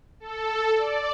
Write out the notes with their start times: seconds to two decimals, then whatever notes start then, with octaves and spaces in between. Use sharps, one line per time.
0.20 A4
0.77 D5